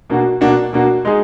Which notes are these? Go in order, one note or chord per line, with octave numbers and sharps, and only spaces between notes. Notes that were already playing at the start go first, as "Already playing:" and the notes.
B2 A#3 D4 F#4
B2 A#3 D4 F#4
B2 A#3 D4 F#4
G#3 D#4 G#4